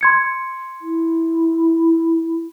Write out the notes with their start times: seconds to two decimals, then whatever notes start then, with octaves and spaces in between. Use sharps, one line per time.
0.01 C6 G#6 C#7
0.81 E4